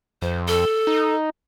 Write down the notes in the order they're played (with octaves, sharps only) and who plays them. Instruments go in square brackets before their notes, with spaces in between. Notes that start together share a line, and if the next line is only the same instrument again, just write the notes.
[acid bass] F2 [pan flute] C5
[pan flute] A4
[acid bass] D#4